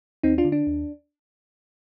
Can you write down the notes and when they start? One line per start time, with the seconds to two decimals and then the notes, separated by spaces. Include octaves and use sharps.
0.23 D#2 C4 D#4
0.38 D4 F4
0.45 D3
0.52 D4
0.67 D#2